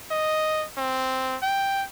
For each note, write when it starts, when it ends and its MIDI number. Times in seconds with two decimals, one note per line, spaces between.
0.11 0.65 75
0.77 1.36 60
1.42 1.84 79